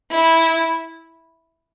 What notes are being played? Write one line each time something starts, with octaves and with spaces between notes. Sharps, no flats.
E4